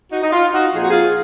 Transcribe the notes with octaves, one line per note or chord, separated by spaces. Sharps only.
D#4 F#4
D#4
F4
D#4 F#4
A#2 F3 C4 D#4 G#4
F#4
F4 G#4